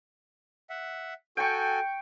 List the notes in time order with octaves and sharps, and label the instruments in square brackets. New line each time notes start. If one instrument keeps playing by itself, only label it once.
[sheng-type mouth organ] E5 F#5
[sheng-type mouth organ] F#4 A4 G#5 [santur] G5 C#6